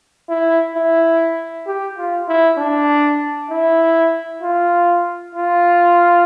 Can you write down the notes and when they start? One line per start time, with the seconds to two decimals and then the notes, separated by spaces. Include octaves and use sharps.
0.29 E4
0.75 E4
1.67 G4
1.98 F4
2.28 E4
2.58 D4
3.50 E4
4.42 F4
5.35 F4